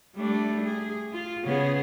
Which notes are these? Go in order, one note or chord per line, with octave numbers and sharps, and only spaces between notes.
G3 A3 D4
G#4
F4
C#3 B3 G#4